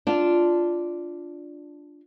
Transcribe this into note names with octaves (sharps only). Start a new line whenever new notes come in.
D4 F4